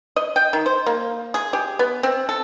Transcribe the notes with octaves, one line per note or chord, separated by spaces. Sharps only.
D#5
G5
D#3
C5
A#3
G#4
G4
B3
C4
A4